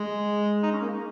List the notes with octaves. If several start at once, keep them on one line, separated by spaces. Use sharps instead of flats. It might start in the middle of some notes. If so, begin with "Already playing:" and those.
Already playing: G#3
D#4
C#4
A#3
G#3